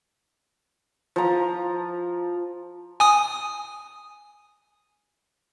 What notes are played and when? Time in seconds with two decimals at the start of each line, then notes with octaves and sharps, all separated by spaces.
1.16 F3 A#5
3.00 G#5 D#6